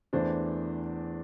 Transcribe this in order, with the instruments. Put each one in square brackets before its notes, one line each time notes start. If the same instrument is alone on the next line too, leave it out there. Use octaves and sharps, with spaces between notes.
[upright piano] E2 E3 A3 D4 C5